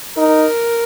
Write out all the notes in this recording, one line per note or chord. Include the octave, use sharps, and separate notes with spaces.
D#4 A#4